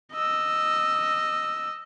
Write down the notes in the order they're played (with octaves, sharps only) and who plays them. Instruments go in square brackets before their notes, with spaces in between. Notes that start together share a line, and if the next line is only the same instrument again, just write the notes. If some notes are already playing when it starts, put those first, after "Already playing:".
[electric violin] D#5 E6